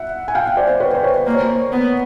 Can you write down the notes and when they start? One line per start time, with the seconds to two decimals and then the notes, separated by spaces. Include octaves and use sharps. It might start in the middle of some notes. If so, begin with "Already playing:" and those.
Already playing: E5 F#5
0.28 G#5
0.35 F5 G5
0.57 C5 D5
0.80 B4 C#5
0.95 C5
1.03 B4 C#5
1.26 A#3 C5
1.34 C#5
1.43 A#4 C5
1.72 B3